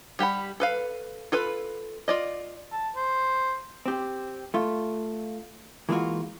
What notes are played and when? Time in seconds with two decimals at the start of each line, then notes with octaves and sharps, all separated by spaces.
0.19 G3 G4 F#5 B5
0.60 A4 B4 F5
1.32 F4 A4 B4 B5
2.08 F4 D5 D#5
2.72 A5
2.96 C5
3.86 C4 G4
4.54 A3 F4
5.89 E3 G#3 A#3 D4 F4 F#4